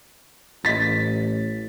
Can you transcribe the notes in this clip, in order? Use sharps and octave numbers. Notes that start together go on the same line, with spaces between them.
A1 A6 B6